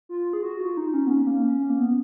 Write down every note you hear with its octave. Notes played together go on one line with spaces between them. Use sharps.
F4
G#4
F#4
F4
D#4
C#4
B3
C#4
A#3
C#4
A#3
B3